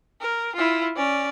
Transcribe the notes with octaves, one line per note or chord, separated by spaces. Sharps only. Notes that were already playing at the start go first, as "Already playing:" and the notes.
A#4
E4 F4
C#4 D5